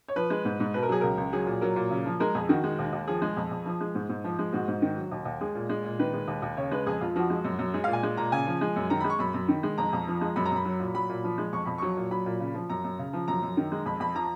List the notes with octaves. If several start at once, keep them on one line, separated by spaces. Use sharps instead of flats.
C#5
F3 B4
G#3
G#2
G#2
B2 B4
A#4
F#3 G#4
C#2 A#4
C#2
F#3 G#4
A#2
F#3 A#4
A#2
C#3
F3
G#3 A#4
F2 G#4
D#3 F#4
G#3
D#2
D#2
F3 G#4
G#3
F2
F2
F3
G#3
G#2
G#2
F3
G#3
G#2 F#4
G#2
D#3
F#3
D#2
D#2
G#3 G#4
A#2
G#3
A#2
D#3 B4
G#3
D#2
D#2
C#3 C#5
G#3 B4
F2 G#4
F2 F4
F3 F#4
G#3
F#2
F#2
G#3 G#4
F5
A#2
G#5
G#3
A#2 A#5
C#3 G#5
F3
G#3
F#2
D#3 A#5
B5
G#3
C#6
F#2 B5
F#2
D#3
G#3
F2 A#5
F2
F3
G#3
F#2 B5
A#5
F#2 B5
F#3
A#2
F#3 B5
A#2
F3
G#3
F2 C#6
F2 B5
F#3 C#6
A#2
F#3 B5
A#2
C#3
F3
F#2 A#5
F#2
C#3
F3
F#2 A#5
F#2
D#3
G#3
F2 B5
F2 B5
F3 A#5